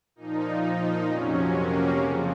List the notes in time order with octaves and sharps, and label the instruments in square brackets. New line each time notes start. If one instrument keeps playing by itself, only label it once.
[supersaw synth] A#2 F3 D#4
F2 C3 F#3 C#4
A#3
F2 C#3 F3